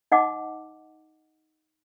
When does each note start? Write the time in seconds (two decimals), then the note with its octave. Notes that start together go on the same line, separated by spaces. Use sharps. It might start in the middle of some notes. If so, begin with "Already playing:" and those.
0.12 D#4 D#5 F#5 A5 D6